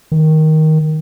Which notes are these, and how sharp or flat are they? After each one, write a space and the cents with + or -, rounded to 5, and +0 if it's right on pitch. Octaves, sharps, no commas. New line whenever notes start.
D#3 +10